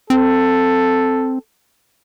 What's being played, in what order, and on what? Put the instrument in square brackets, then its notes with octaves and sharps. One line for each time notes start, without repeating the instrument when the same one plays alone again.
[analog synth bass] C4 [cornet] A4